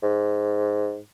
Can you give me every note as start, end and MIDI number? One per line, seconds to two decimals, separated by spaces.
0.03 1.01 44